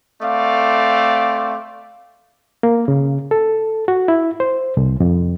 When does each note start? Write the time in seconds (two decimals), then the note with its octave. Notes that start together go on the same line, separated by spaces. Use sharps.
0.22 A3 C4 D5 F5
2.63 A#3
2.88 C#3
3.31 A4
3.88 F#4
4.08 E4
4.40 C5
4.77 C2
5.00 F2